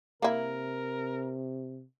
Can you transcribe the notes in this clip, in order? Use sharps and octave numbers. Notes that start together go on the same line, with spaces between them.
C3 A#3 E4 A#4